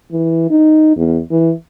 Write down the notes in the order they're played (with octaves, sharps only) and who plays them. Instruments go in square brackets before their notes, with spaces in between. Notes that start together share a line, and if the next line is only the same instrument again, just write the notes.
[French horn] E3
D#4
E2
E3